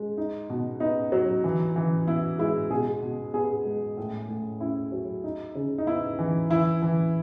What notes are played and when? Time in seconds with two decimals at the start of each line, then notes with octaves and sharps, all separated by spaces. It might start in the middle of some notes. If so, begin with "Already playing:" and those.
Already playing: G#3
0.18 D#4
0.50 B2
0.80 B3 D#4
1.12 F#3
1.44 E3
1.76 E3
2.07 B3 E4
2.39 G#3 E4
2.70 B2 G#4
3.02 B2
3.34 B3 G#4
3.65 G#3
3.97 A2
4.29 A2
4.60 C#4 E4
4.92 F#3
5.24 D#4
5.55 C#3
5.78 D#4
5.87 B3 E4
6.19 E3
6.50 E3 E4
6.82 E3